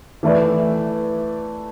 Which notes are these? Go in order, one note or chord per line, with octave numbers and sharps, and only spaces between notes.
E3 A3 E4 B4 D5